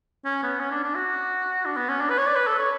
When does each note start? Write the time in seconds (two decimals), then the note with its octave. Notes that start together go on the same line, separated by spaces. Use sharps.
0.25 C#4
0.43 B3
0.60 C#4
0.71 D4
0.83 D4
0.95 F#4
1.65 D4
1.77 B3
1.89 C#4
2.01 D4
2.10 B4
2.18 C#5
2.27 D5
2.36 B4
2.47 A4
2.59 C#5